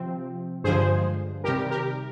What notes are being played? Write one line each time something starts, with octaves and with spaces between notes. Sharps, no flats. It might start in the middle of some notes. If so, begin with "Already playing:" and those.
Already playing: C3 F3 C4
G2 D3 F3 G#3 G#4 C5
C3 D#3 G3 G4 A#4
G4 A#4